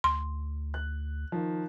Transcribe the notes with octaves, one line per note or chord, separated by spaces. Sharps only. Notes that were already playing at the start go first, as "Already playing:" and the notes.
D2 C6
F#6
D#3 F3